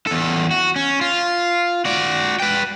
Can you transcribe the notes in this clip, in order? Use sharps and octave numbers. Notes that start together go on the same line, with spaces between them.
E2 A4
F#4
C#4
F4
F#4 D5
B4 G5